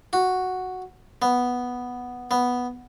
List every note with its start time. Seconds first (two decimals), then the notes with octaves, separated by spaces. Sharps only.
0.13 F#4
1.22 B3
2.31 B3